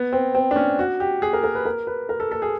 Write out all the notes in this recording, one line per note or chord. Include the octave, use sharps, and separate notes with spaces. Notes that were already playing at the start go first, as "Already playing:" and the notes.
Already playing: B3
C4
C4
D4
C#4
F#4
G4
G#4
A#4
A#4
B4
A#4
B4
A#4
A4
A4
G#4